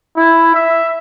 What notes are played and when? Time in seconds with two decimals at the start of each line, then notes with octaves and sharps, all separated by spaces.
0.16 E4
0.55 E5